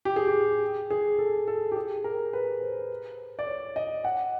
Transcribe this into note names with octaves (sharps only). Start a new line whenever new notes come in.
G4
G#4
G4
G#4
A4
A4
G4
G#4
A#4
B4
C5
D5
C#5
D#5
F#5